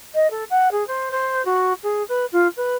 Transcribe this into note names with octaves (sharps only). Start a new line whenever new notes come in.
D#5
A4
F#5
G#4
C5
C5
F#4
G#4
B4
F4
B4